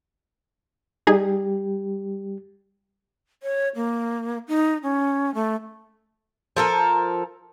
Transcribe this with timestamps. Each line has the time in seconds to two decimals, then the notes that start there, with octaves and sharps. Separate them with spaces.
1.07 G3 D#4 G4 G#4
3.43 C#5
3.75 A#3
4.48 D#4
4.83 C#4
5.34 A3
6.56 F3 A4 A#4